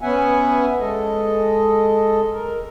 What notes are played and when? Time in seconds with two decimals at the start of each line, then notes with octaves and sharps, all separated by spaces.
0.01 B3 C#4 E5 F#5 G#5
0.80 G#3 A4 D#5
2.32 A#4